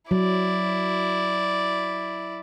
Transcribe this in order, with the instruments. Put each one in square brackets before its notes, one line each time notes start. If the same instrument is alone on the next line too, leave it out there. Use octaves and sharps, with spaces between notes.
[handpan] F#3 [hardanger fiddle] E4 D5